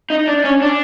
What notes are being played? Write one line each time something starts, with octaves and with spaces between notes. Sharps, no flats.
D#4
D4
C#4
D4